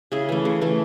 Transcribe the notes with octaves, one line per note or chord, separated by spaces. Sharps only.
C#3 E4 G#4
E3 A3
C#3
E3 A3